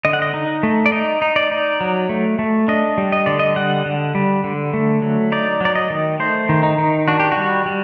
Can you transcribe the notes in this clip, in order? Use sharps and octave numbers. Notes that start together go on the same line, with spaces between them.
D3 D#5
F#5
D#5
D#4
A3
D5
D#4 D#5
D#4
D5
D#4
F#3
A3
A3
D4 D#5
G3
D#5
D3 D5
D#5
G3 F#5
D3
G3
D3
A3
F#3
D#4 D5
F#3 D5
D#5
D#3
A3 C5
D#3
D#4
D#3
D4 F#4
G4
F#4
G3
G3